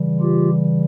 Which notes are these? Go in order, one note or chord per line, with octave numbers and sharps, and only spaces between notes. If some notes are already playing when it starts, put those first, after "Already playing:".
Already playing: C#3 E3 G3
F4 G4